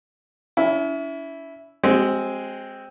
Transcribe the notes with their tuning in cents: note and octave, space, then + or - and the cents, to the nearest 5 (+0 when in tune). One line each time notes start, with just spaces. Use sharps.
C#4 +40 E4 +0
G#3 +0 C4 +5 F#4 +45